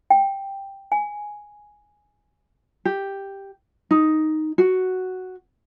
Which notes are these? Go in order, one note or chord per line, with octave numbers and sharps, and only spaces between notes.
G5
G#5
G4
D#4
F#4